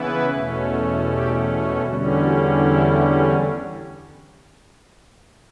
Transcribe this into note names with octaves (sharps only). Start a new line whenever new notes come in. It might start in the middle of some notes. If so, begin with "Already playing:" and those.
Already playing: C#3 E3 B3 E4 B4
E2 B2 A3 C#4
G4
E2 D3 G3 C#4 F#4
F#4
E4